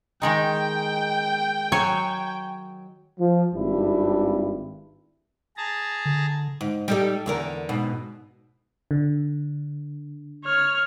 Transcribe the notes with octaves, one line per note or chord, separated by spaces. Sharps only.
D#3 G#3 D#4 G5
F#3 C#5 G#5
F3
G#1 G2 E4
G#4 A5 A#5
D3
G#2
G3 D#4 A4
E2 D3 A#4
G#2 B2
D3
C#5 F6